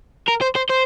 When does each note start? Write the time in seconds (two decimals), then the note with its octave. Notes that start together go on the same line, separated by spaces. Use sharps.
0.28 A#4
0.42 C5
0.56 C5
0.70 C5